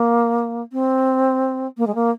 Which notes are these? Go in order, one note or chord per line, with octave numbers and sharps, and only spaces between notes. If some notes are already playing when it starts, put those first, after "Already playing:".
Already playing: A#3
C4
A#3
G#3
A#3